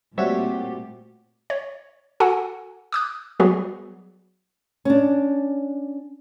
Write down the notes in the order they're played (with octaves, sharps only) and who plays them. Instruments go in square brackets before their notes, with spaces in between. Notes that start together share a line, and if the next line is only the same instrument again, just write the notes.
[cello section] A#2 A3 G4 [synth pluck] G3 C#5 E5 [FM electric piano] C4 F#4
[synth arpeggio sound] C#5
F#4 A4 F#5 G#5
D6 D#6 F#6
F#3 G3 B3 F#4 G#4
[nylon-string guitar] C#4 D4